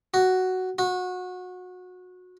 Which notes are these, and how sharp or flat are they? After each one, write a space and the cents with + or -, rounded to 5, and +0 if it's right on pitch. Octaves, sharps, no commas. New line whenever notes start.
F#4 +5
F#4 -25